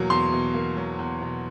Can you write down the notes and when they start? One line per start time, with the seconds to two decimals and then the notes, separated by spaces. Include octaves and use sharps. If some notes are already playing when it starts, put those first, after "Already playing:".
Already playing: E2 B2 F#3 A#3
0.10 E2 C6
0.32 B2
0.54 A#3
0.77 F#3
0.99 E2
1.21 B2